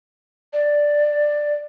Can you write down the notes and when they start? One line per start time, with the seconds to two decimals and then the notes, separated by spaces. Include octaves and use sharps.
0.53 D5